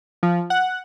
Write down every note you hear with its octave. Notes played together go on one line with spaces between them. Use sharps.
F3
F#5